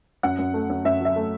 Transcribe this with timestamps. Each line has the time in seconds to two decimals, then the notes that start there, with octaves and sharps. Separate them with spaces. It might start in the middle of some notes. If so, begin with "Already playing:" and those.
0.23 F#2 F#5
0.39 F#2
0.54 A3
0.70 F#2
0.85 F#2 E5
1.00 F#3 E5
1.16 A3